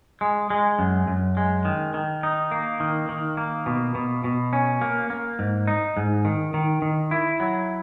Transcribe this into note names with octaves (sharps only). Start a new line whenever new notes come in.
G#3
G#3
F#2
F#2
G#3
D#3
D#3
D#4
A#3
D#3
D#3
A#3
B2
B2
B2
C#4
A#3
A#3
G#2
D#4
G#2
D#3
D#3
D#3
E4
F#3